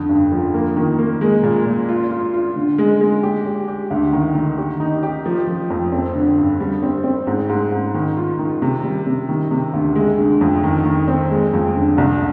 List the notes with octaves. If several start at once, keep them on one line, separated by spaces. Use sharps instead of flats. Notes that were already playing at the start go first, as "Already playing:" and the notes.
Already playing: F2 D3
G2
F3
A#3
D#3
A#3
G#3
A#2
A#2
F4
F4
F4
D3
G#3
G#3
G4
G4
G4
D2
D#3
D#3
G4
D#4
G4
F3
F3
F2
C4
D3
G2
G3
C4
C4
G#2
G#2
G#2
D#3
F4
D#3
C3
G3
C3
D#3
C3
D2
G#3
D3
F2
D#3
D#3
C4
G#3
F2
D3
C2